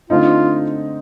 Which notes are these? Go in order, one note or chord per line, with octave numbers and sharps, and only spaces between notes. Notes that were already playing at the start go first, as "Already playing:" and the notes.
D3 A3 C4 D#4 F4